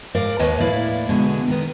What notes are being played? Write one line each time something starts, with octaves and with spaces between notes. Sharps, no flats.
G#2 A#4 D5 F5
D#2 D#3 B4 C#5 D#5
A2 A#3 E4 D5 F5
B2 D3 G#3
D#3 B3